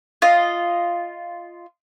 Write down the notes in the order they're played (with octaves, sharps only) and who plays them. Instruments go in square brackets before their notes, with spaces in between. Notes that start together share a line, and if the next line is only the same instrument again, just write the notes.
[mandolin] F4 D#5